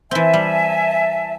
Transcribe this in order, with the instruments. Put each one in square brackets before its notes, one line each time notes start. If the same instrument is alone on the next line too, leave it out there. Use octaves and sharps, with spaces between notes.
[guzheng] E3 C4 [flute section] E5 G#5 A5
[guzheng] G3